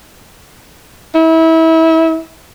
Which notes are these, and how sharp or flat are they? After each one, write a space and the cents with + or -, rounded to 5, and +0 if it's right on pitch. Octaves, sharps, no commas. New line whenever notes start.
E4 -30